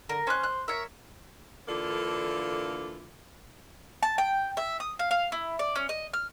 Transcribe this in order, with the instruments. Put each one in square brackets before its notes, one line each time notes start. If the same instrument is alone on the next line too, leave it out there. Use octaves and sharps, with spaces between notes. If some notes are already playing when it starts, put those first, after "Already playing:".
[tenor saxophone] D3 [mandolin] A#4
[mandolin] C#4 D#6 F#6 [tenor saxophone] C5
[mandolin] F#6
[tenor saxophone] A#4 [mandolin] C#5 E5
[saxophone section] D3 E3 A#3 D4 F4 A4
[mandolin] A5
G5
E5
D#6
F5
F5
E4
D5
C#4
D#5
F6